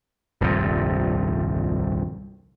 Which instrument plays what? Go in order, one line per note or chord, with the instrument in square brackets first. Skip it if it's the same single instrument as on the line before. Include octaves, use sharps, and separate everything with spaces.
[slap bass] D#1 C2 G2 F3